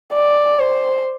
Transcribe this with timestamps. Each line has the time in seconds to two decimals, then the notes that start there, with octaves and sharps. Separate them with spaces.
0.14 D5
0.60 C5